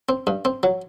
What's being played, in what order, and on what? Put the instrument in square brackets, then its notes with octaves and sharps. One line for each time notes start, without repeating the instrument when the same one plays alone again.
[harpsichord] C4
G2
C4
F#3